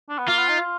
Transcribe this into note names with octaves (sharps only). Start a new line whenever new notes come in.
D4
B3
A#3 F4
B3
D#4
F4